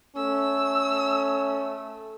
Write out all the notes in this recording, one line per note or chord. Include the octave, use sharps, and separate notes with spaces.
A3 C#4 E6